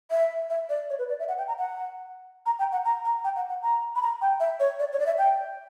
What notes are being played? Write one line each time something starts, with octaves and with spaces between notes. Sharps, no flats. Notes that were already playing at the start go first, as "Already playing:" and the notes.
E5
E5
D5
C#5
B4
D5
E5
F#5
G5
A#5
F#5
A#5
G5
F#5
A#5
A#5
G5
F#5
F#5
A#5
B5
A#5
G5
E5
C#5
D5
C#5
D5
E5
G5